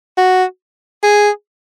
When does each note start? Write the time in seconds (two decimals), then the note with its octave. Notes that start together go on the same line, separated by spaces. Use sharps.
0.18 F#4
1.03 G#4